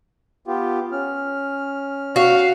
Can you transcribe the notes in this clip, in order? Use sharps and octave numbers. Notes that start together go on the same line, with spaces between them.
B3 F4 G4
C#4 F6
F#4 F5